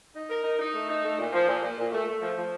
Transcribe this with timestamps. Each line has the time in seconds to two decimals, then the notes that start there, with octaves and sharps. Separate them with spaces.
0.15 D#4
0.30 A#4
0.44 D#4
0.59 D#4
0.74 A3
0.89 D#4
1.04 A3
1.19 A#2
1.33 F3
1.48 A#2
1.63 A#2
1.77 A#2
1.92 A3
2.07 A3
2.21 F3
2.36 F3